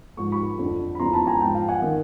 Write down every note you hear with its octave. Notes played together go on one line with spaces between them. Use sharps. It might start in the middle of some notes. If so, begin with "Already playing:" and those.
G#2 F3 C#6
B5 C#6
F2 D3 F3
B5
E2 C#3 F3 A#5 C6
A5 B5
G#5 A#5
G#2 F3 G5 A5
F5 G5
F#5 G#5
D#3